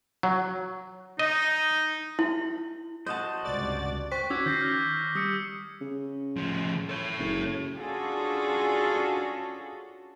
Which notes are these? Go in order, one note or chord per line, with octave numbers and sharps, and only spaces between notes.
F#3
D#4 D#5
E4
F#4 C5 D#5 A5
C#2 G2 C3 D5 A6
C5 G5 C#6 F#6 B6
C#4 F#4 D6 E6 G#6
D#3 G6 A#6 C7
F6 A#6
G3 D#6 E6 C#7
C#3
A2 F3
A4 C#5
F#1
C#4 D4 F4 F#4 G#4 A4